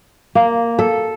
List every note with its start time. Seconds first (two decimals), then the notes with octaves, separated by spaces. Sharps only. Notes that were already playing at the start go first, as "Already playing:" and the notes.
0.35 A#3
0.79 A4